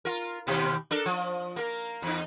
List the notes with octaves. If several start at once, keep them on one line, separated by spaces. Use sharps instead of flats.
F4 A#4
D#2 B2 G4
D4 A4 A#4
F3
A#3 A#4
E2 D#4